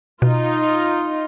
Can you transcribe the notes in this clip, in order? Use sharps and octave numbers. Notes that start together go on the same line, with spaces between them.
B2 D#4 F4